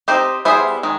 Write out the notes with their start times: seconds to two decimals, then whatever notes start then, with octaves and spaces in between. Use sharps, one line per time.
0.08 C4 D#4 G4 C5 D#5
0.45 G3 B3 E4 G#4 C5
0.83 D#3 G#3